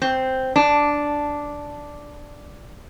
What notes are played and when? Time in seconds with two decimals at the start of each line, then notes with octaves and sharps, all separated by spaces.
0.02 C4
0.56 D4